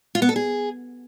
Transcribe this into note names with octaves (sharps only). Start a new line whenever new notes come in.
F4
B3
A4
G#4